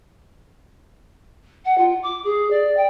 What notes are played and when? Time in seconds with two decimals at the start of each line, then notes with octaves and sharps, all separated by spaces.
1.65 F#5
1.77 F4
2.02 D6
2.24 G#4
2.50 D5
2.76 G5